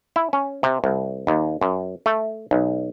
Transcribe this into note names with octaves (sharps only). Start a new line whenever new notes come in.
E4
C#4
C3
C2
D#2
F#2
A3
B1